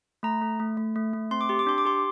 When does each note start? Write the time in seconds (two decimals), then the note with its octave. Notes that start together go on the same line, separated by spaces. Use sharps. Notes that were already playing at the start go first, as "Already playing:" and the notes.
0.23 A3 A#5
0.42 A3
0.60 A3
0.77 A3
0.96 A3
1.13 A3
1.31 C4 C6
1.41 D6
1.49 G4 C6
1.59 D6
1.67 D4 C6
1.78 D6
1.85 G4 C6